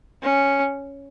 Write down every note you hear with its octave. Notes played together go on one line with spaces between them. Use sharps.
C#4